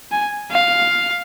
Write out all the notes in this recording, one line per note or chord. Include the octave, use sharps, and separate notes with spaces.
G#5
F5